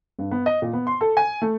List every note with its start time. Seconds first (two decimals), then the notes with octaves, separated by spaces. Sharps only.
0.19 G2
0.31 B3
0.46 D#5
0.62 A#2
0.73 B3
0.87 C6
1.01 A4
1.17 G#5
1.42 A3